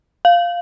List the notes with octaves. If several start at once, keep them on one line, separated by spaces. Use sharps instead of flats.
F5